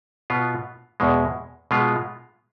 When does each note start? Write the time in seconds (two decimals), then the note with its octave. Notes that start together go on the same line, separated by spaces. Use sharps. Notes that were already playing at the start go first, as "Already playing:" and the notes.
0.30 B2 B3 F4
1.00 E2 B2 G#3
1.71 B2 G#3 B3 F4